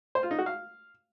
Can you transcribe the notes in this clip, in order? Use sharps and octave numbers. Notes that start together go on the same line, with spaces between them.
C5
F4
D#4
F#4
F5